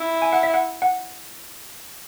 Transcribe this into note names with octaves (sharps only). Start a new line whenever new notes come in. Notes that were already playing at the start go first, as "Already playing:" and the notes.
Already playing: E4
G#5
F#5
E5
F#5
F#5